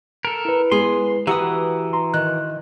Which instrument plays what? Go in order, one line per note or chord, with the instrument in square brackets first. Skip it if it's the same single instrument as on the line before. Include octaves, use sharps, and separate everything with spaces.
[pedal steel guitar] A4 A#4
[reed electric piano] E4 B4
[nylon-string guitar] G#3 B3 G#4 [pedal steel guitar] C6
[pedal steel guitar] E3 F#4 D#6 [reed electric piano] G4 A#5 E6 [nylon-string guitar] B4 F#5
[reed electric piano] A#5 C6
[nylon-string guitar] D#3 [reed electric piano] F#6